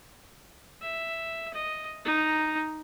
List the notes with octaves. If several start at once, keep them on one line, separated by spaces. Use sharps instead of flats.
E5
D#5
D#4 A#5